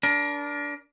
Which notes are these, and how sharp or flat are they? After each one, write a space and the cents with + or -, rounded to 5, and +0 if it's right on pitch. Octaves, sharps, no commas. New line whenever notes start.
D4 -15 A#4 +30